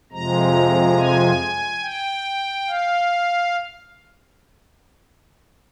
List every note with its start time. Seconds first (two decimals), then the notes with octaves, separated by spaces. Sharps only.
0.12 F2 C3 F3 G#3 A#5
0.97 G#5
1.82 G5
2.67 F5